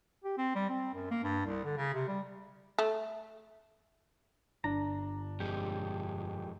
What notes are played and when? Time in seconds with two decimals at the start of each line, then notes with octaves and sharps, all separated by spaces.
0.24 G4
0.38 C4
0.55 G3
0.69 C4
0.94 F#2
1.11 A#3
1.23 G2
1.46 C2
1.64 D3
1.77 C#3
1.94 C3
2.08 G3
2.79 A3
4.64 G1 D4 A#5
5.40 F2 G#3 G4